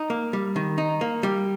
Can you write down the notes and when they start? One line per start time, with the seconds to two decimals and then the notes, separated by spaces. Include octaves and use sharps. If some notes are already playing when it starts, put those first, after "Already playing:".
Already playing: D#4
0.10 A#3
0.33 G3
0.56 D#3
0.78 D#4
1.01 A#3
1.23 G3